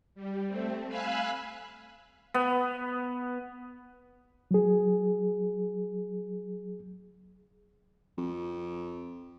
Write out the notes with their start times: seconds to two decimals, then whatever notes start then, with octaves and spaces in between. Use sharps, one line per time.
0.15 G3
0.47 A3 C4
0.88 F5 G#5 B5 E6 F#6
2.34 B3
4.51 F#3 G#4
8.18 F2